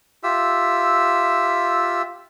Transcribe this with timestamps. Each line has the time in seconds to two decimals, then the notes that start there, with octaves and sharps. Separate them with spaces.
0.23 F4 G4 E5 E6